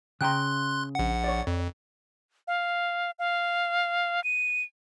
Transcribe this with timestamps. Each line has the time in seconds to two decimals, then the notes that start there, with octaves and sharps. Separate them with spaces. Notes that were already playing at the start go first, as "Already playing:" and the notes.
0.21 C#3 G5 A#5 C6 F#6
0.95 A#1 F#5
1.24 C#5 D5
1.47 F2
2.48 F5
3.19 F5
4.24 D#7